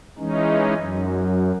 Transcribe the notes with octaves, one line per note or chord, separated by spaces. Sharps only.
E3 G#3 C#4 D#4
F#2